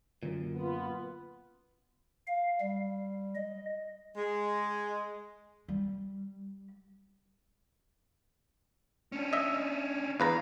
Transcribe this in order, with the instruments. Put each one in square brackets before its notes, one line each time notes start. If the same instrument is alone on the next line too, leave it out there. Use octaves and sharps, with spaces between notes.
[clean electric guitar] F#2 A#2 [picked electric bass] D3 F#3 A#3
[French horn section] B3 [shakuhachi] F4
[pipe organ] F5
G3
D#5
[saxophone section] G#3
[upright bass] G3
[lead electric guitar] C#4 D4
[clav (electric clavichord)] D#5 E5
[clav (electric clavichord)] E2 B4 A#5 [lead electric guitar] F5